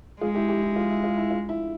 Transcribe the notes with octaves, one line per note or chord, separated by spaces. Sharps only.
G#3 F4 G#4
E4 G4
E4 G4
E4
F4
E4
F4
E4
F4
E4